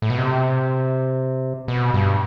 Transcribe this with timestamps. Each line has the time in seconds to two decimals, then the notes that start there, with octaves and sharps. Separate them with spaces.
0.02 A2
0.10 B2
0.18 C3
1.68 B2
1.94 G2